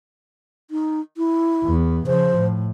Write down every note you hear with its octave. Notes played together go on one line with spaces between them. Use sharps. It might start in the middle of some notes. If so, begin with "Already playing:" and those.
D#4
E4
E2 B3
C#3 F3 C5
A2